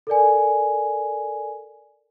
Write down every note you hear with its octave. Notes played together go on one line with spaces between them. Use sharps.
A4 A#4 D5 G#5